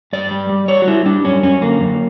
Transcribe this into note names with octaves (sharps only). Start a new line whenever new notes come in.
G2 D5
G3
G3
G3 C#5
F#4
G3 E4
G3 D4
F#2 C#4
F#2 C#4
D3 A#3
F#2